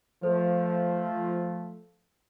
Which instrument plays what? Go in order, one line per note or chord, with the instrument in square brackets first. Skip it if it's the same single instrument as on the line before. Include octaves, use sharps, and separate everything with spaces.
[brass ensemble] F3 A3 [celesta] A4 C5